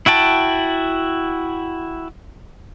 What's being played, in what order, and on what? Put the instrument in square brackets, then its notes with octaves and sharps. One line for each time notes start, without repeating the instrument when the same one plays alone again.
[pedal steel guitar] E4 F#4 G5 A5